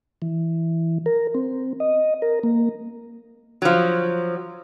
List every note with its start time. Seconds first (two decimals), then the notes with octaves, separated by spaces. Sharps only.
0.22 E3
1.06 A#4
1.34 C4
1.80 D#5
2.22 A#4
2.43 A#3
3.62 F3 F#3